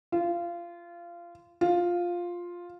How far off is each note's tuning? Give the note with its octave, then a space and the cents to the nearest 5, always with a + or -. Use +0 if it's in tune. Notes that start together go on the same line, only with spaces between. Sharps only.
F4 -20
F4 +5